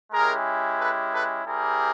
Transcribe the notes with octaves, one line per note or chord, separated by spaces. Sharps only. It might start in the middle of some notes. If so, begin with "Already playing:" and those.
G#3 C#4 E4 G4 G#4 A#4
A4 B4
A4 B4
G3 C4 E4 G4 G#4 A#4